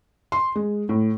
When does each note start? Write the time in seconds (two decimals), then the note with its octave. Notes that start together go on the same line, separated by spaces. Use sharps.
0.32 C6
0.56 G#3
0.89 A2